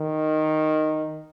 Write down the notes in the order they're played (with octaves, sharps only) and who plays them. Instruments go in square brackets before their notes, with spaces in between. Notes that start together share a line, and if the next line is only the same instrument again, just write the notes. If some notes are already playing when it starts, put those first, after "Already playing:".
Already playing: [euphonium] D#3